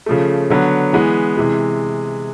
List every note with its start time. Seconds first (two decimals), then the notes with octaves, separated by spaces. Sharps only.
0.06 C#3 F3 A3
0.50 D3 F#3 B3
0.93 E3 G#3 B3
1.37 C3 E3 G#3